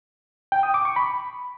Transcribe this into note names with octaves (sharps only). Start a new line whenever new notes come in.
G5
D#6
D6
C#6
B5